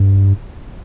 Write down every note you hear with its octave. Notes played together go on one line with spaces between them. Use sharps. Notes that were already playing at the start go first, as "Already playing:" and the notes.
Already playing: G2